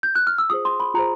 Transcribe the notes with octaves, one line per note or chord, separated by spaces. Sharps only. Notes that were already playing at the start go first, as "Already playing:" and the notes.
G6
F#6
F6
E6
F4 G#4 C5 D#6
C6
B5
F4 G#4 C5 A#5